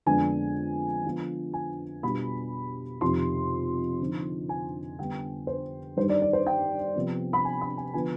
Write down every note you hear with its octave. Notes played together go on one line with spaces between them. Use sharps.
F2 D3 G#3 B3 D4 G#5
D3 F3 B3 F4
G#5
B2 G3 D4 F4 B5
F2 C3 D#3 C6
D3 F3 C4 D#4
G#5
D3 G3 B3 G5
C5
G2 D#3 G3 D4 C5
D5
D5
C5
G5
C3 F3 B3
B5
G#5
B5
G#5
D3 F3 B3 F4 G#5